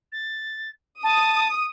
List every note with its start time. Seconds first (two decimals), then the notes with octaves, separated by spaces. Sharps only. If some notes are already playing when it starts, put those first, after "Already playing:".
0.12 A6
1.03 A5 D#6